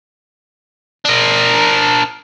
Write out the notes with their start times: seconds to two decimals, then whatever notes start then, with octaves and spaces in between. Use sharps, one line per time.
1.05 D4 A#4